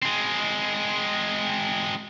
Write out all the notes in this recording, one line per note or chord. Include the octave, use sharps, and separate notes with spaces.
G#3 C4